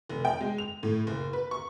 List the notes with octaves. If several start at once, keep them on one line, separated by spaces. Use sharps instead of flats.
F1
G5
G#3
F7
A2
F#1
B4
C#6